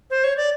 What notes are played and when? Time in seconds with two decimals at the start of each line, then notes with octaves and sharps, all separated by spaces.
0.10 C5
0.24 C#5
0.37 D5